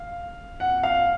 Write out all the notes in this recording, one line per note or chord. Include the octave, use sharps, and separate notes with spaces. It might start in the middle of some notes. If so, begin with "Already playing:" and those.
Already playing: F5
F#5
F5